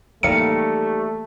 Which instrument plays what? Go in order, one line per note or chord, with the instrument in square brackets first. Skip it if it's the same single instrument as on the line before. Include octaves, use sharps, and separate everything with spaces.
[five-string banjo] D#3 G3 F5 [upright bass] E3 A#3 [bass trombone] A3 [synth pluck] C#7